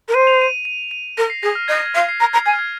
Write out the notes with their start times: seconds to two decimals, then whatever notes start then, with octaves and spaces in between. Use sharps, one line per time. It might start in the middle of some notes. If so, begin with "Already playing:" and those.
0.08 A#4
0.14 C5 D#7
0.27 F7
0.41 D#7
0.65 D#7
0.91 D#7
1.17 A#4 A#6
1.30 C7
1.42 G#4 A#6
1.55 F6
1.68 D#5 G#6
1.78 A#6
1.86 G#6
1.94 F5
2.09 C7
2.20 A#5 A#6
2.33 A#5 G#6
2.45 G#5 G#6
2.53 F6
2.59 G#6